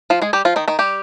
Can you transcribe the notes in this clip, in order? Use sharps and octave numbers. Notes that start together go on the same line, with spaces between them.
F3 F4
G#3 G#4
G3 G4
F3 F4
D#3 D#4
D#3 D#4
G3 G4